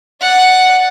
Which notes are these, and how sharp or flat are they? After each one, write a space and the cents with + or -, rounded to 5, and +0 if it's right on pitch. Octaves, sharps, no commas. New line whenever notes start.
D5 +0 F#5 +0